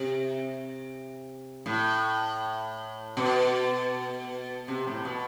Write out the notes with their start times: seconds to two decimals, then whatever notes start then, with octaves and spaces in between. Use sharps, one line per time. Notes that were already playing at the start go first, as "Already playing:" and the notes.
Already playing: C3
1.66 A2
3.17 B2
4.68 C3
4.87 A2
5.05 B2